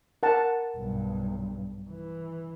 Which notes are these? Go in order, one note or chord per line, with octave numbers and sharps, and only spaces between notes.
A#4 F#5 A5
B1 G2
E3